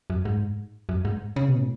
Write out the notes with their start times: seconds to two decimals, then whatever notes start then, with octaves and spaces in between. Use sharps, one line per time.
0.10 F#2
0.25 G#2
0.89 F#2
1.05 G#2
1.36 C#3
1.48 B2
1.58 A2